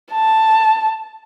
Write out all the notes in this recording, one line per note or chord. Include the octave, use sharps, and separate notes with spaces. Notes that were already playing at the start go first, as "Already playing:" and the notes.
A5